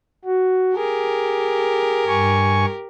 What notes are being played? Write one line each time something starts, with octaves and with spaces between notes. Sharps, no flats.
F#4
G4 G#4 A#4
G2 G#5 C#6